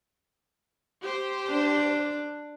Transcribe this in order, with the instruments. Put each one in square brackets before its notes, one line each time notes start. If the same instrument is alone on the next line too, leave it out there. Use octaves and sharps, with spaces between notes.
[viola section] G4 C5
[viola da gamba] D4